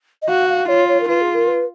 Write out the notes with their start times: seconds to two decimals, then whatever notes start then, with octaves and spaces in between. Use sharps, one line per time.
0.22 D#5
0.29 F#4 F5
0.49 F5
0.68 F4 C#5
0.88 C#5
1.00 A#4
1.09 F4 B4
1.21 G#4
1.35 A#4
1.47 B4